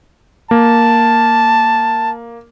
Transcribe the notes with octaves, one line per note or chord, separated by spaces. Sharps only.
A#3 A5